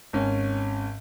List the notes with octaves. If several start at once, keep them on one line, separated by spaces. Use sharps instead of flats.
G#1 C#4